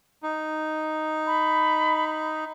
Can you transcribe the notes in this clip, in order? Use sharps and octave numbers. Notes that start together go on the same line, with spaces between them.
D#4
B5